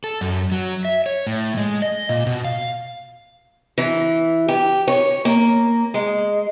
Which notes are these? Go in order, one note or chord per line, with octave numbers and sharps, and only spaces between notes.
A4
F#2
F#3
E5
C#5
A2
G#3
D#5
A#2
B2
F5
E3
G4
C#5
A#3
G#3